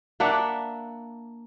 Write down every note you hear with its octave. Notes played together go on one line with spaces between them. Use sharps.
A#3 D4 E5 F#5